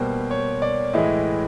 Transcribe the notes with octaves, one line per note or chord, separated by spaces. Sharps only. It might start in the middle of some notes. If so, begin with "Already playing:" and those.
Already playing: B2 G3 A#3 C5
C#5
D5
A2 E3 G#3 D#5